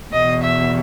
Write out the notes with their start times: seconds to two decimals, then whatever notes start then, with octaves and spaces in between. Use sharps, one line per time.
0.12 E2 B2 D#5
0.43 E5